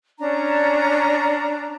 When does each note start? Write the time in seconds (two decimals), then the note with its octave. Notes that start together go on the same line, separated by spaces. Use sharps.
0.19 C#4 D4 A#5